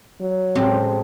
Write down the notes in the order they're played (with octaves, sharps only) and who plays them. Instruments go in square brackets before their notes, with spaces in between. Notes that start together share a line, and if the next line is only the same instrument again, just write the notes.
[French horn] F#3
[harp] A1 G#3 [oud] C4 G4